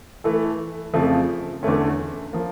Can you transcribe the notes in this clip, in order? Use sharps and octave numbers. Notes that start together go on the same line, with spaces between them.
E3 A3 E4 A4
F2 C#3 F3 A3
E2 D3 A3 C#4
F3 A#3